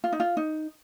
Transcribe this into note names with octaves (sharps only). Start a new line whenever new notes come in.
F4
D#4
F4
D#4